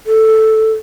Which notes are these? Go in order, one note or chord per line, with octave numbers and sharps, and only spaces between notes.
A4